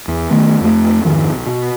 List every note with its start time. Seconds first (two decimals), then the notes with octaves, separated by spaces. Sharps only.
0.08 E2
0.31 D#3 A3 B3
0.61 F2 A3
1.05 F2 G#2 D#3 F3
1.32 B1
1.46 B2